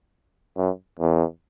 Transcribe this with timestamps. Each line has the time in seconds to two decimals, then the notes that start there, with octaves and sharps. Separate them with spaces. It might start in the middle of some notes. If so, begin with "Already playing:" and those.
0.57 F#2
0.99 E2